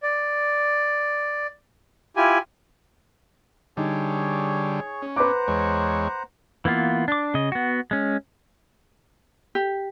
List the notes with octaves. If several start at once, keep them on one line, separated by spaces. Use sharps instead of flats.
D5
E4 F4 G4 G#5
D3 G3 D#4 G#4 C#5 C#6
C#4
B4 C5 F#5 A#5 D6
E2 G#3 C#5
E3 A#3 B3 F4
D4 D6
C#3 D#5
B3 F#4
G#3 C#4
G4